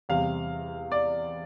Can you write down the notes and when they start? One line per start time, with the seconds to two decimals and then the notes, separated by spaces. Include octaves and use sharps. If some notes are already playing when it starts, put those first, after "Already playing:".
0.09 E2 C3 G3 F5
0.92 D5